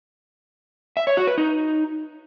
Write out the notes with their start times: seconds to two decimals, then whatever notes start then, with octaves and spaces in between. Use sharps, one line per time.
0.97 E5
1.07 C#5
1.17 F#4
1.27 B4
1.38 D#4